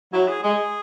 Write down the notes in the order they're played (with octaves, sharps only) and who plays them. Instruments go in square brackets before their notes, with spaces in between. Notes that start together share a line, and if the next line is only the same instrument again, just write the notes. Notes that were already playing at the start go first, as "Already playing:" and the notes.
[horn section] F#3 [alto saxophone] E4
[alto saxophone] G#4
[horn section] G#3 [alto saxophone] G#4